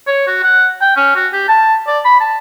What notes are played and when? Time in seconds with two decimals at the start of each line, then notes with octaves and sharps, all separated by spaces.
0.07 C#5
0.27 F#4
0.43 F#5
0.82 G5
0.96 C#4
1.16 F#4
1.33 G4
1.48 A5
1.87 D5
2.05 B5
2.20 A5